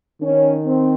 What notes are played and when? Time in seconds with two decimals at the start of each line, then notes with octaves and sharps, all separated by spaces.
0.21 D#3 C#4
0.66 C4